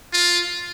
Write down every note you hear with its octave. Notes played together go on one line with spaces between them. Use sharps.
F4